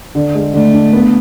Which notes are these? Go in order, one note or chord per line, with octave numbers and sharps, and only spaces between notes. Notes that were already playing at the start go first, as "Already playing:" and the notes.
D3
G#3
D3 A3
D4
B3